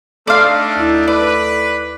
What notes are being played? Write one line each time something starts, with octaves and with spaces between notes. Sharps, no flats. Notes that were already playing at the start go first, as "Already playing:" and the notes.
A3 D4 D#4 D5 F5 C6
D#2 E4
B4 D5